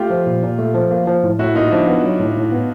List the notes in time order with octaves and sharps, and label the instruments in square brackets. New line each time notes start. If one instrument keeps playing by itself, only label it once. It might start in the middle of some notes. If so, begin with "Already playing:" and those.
Already playing: [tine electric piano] A3 [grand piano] F4 G4
[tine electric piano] F3
A#2
A#2
A3
F3
A#3
F3
A2
[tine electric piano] A2 [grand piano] E4 F#4
[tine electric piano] A#3 [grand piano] D#4 F4
[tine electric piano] F3 [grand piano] D4 E4
[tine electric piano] B3
F#3
A2
A2
B3